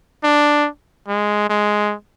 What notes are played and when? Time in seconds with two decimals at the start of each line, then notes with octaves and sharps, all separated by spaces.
0.24 D4
1.08 G#3
1.50 G#3